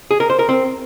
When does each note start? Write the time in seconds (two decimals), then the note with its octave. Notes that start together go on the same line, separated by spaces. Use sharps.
0.11 G#4
0.20 A#4
0.30 C5
0.39 A#4
0.49 C4